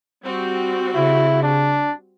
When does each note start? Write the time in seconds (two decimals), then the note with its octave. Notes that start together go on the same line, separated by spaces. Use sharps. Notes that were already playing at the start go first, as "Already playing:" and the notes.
0.23 G3 C4 F#4
0.95 C#3 E4
1.43 D4